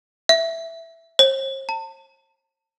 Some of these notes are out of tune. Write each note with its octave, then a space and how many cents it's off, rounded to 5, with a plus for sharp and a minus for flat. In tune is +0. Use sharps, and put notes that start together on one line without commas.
E5 +5
C5 +45
A5 +35